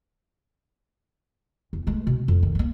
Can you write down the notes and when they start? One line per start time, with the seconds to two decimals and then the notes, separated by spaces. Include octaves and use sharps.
1.73 E2
1.87 G#3 A3
2.07 B2
2.28 F2
2.43 D#3
2.55 A3 A#3